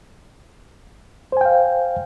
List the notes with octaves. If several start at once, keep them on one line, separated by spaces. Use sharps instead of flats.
C5 F5 G5 G#5